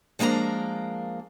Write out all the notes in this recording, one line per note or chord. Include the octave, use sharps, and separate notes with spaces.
F3 G#3 A#3 D4 A#5